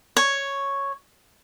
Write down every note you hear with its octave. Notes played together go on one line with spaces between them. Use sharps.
C#5